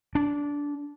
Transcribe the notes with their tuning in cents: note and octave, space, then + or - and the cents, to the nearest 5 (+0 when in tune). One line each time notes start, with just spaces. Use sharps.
D4 -15